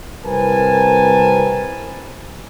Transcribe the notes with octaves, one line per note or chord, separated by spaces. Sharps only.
C2 C4 A#4 B4 G#5 A5